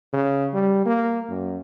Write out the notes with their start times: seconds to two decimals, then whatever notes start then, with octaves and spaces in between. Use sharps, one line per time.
0.13 C#3
0.53 G3
0.86 A#3
1.29 F#2